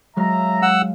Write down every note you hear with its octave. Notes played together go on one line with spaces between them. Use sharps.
F#3 G#3 E5 F5 A#5
F#5 E6